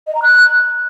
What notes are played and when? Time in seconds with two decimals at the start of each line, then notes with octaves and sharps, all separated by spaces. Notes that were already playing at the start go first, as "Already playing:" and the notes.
0.07 D#5
0.15 A#5
0.22 F#6